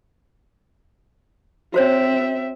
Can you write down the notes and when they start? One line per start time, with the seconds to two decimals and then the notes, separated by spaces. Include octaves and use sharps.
1.74 C4 F#4 C5 C#5 E5